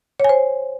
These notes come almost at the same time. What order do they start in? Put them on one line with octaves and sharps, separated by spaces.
C#5 G#5 C5